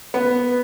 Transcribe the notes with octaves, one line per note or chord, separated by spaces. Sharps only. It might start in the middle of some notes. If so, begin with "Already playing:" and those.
B3